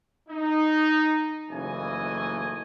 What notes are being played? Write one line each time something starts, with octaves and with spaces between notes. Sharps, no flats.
D#4
F#1 D#2 E3 A3 D#5 G#5